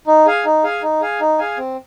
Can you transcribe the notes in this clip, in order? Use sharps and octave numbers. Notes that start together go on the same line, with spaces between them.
D#4
G#4 F5 G#5
D#4
G#4 F5 G#5
D#4
G#4 F5 G#5
D#4
G#4 F5 G#5
C4